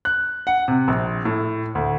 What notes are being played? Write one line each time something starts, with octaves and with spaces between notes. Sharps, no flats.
F#6
F#5
C3
A#1
A2
D2